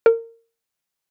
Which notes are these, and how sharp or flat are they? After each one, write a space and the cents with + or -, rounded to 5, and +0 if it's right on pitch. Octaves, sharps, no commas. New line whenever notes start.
A#4 -25